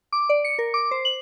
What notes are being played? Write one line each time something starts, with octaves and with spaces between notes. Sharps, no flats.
D6
D5
C#7
A#4
D6
C5
F#7